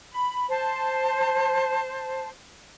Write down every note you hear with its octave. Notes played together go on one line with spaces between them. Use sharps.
B5
C5 A5